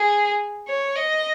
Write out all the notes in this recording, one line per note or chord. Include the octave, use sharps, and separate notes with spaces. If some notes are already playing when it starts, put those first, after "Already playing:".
Already playing: G#4
C#5
D#5